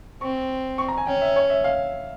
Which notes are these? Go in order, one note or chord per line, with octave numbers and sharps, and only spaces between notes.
C4 C#6
C#6
A#5
G#5
C#4 G5
E5
C#5
E5
F5